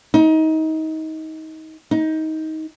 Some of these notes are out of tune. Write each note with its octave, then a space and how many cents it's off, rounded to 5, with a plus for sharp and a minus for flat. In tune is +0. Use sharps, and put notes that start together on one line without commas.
D#4 +25
D#4 +20